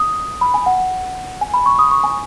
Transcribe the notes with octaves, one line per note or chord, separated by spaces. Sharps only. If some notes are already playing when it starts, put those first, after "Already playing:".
Already playing: D#6
B5
G#5
F#5
G#5
B5
C#6
D#6
C#6
G#5